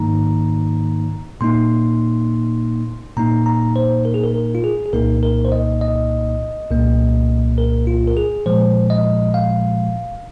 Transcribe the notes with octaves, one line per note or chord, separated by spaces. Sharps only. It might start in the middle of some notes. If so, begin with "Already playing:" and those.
Already playing: G#2 D#3 A#3 D#4 A#5
A#2 A#3 D#4 C6
A#2 A#3 D#4 A#5
A#5
C5
A#4
G#4
A#4
A#4
F4
G#4
G#4
C2 A#2 A#3 D#4 A#4
A#4
C5
D#5
D#5
C2 A#2 A#3
A#4
F4
A#4
G#4
A#2 F3 G#3 C5
D#5
F5